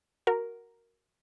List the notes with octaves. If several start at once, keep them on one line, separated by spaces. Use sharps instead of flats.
F#4 A#4